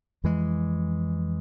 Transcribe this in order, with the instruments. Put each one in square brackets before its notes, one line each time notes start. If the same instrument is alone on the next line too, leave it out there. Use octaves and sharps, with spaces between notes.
[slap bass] F2 E3 G#3